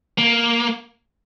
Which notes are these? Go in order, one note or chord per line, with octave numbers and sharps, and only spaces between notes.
A#3